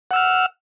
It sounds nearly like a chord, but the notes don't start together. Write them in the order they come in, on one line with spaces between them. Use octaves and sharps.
F#5 E6 F6